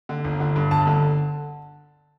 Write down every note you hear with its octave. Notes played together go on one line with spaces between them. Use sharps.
D3
G1
D3
G2
G1 A5
D3